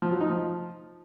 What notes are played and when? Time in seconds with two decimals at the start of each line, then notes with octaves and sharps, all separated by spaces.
0.02 F3
0.11 F#3
0.21 D#4
0.30 F3